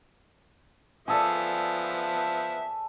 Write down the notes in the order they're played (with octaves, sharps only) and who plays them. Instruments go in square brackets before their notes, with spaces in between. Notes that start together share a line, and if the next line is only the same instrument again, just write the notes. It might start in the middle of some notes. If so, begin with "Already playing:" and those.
[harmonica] F3 B3 E5 [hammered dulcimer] G#4 A4 D5